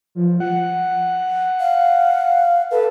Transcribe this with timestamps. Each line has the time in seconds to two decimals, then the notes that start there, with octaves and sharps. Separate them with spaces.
0.15 F3
0.40 F#5
1.60 F5
2.71 A4 B4